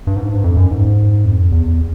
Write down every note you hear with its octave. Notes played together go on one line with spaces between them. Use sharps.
G2
G#2
G2
F2
F#2
G#2
F2
E2